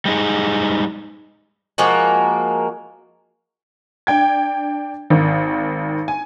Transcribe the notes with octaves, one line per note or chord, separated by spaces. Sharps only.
G3 G#3 D#4 G#4
F3 G#3 A#3 F#4
D4 G5 G#6
G#1 D#3
G#5